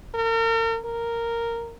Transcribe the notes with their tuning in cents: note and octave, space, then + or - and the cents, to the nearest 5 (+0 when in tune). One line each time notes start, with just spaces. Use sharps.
A#4 -40
A#4 -5